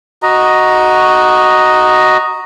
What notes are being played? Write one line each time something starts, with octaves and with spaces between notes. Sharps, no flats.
F#4 D#5 A#5